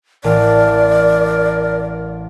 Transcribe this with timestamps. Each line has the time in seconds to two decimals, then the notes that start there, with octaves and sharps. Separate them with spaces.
0.24 A1 A#4 D5